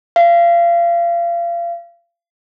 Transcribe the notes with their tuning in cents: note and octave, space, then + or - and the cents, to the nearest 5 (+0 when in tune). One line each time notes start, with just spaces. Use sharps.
F5 -30